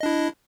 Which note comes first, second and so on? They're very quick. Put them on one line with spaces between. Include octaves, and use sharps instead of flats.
D#5 D4 E4